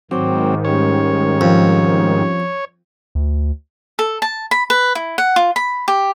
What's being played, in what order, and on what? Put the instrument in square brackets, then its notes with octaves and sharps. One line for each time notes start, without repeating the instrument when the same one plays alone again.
[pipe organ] G#2 D#3 [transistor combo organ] F#3 C4 [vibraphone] G5 C#6 D6
[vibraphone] G3 C#4 G4 [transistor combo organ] C#5
[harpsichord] F2
[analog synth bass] D2
[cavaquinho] A4
A5
B5
B4
E4
F#5
F4
B5
G4